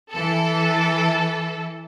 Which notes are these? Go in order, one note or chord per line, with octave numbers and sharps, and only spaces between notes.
E3 A4